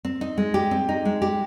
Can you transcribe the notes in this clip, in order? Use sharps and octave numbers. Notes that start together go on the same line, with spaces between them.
C4
D#4
G#3
G4
C4
D#4
G#3
G4